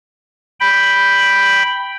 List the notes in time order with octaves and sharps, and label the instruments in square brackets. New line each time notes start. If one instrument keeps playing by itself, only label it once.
[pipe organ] G5 B5